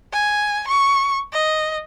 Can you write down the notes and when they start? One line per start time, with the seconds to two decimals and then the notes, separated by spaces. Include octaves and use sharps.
0.13 G#5
0.68 C#6
1.32 D#5